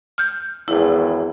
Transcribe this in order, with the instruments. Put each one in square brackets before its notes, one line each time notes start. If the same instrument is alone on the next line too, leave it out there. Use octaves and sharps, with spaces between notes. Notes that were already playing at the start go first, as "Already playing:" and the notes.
[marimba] F6 G6
[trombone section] G#1 E2 [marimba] E4